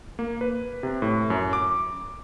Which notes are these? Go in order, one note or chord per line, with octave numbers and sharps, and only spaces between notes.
A#3
B4
C3
A2
F#2
D6